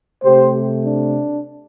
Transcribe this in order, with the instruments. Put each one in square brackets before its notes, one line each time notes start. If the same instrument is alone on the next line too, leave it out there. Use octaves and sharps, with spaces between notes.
[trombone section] C3 A3 G4 C5
D4